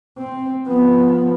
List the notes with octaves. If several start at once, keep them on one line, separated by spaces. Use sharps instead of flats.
C4
F3 B3